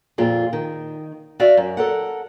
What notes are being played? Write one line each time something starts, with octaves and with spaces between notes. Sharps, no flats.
F2 A#2 F4 G#4
D#3
F#4 D5 E5 F5
F#2
A4 A#4 F#5